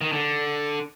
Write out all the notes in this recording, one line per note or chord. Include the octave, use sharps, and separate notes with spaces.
D#3
D3